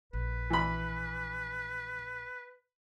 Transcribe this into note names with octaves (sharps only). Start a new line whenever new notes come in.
A#1 B4
E3 B5